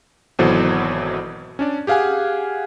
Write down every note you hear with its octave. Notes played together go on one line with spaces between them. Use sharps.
G#1 B2 E3 F#3 A4 C5
C#4 D4 D5
G4 G#4 F5 F#5 G#5